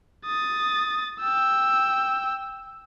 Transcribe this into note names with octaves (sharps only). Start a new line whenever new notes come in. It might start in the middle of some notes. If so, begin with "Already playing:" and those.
D#6 A6
G5 E6